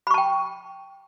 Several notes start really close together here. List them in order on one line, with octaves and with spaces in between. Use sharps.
B5 C#6 A5 G5